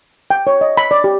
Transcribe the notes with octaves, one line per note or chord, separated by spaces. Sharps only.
G5
C#5
D#5
B5
D5
G4